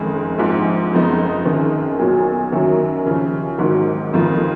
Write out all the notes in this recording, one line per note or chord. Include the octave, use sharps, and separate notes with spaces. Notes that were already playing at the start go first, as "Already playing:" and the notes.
Already playing: F#1 F2 D#3 G#3
A#1 G#2 F3
F#1 F2 F3 B3 D#4
F#1 F#2 D#3
B1 A#2 F#3
F#2 D#3 F#3 A#3
D#2 C#3 F3
G#1 G#2 D#3 F#3
F1 F2 D#3 A#3 F4